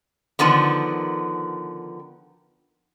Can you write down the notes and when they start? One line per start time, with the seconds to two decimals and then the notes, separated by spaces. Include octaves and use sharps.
0.39 D3 D#3 F3 B3